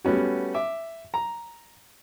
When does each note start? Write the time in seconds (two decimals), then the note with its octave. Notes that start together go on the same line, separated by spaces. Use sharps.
0.05 G3 A3 B3 C#4 F#4
0.54 E5 D6
1.14 A#5